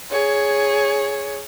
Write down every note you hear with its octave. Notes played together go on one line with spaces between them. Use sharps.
G#4 C#5